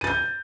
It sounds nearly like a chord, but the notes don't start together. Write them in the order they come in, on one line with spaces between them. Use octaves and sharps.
D#7 A6 G6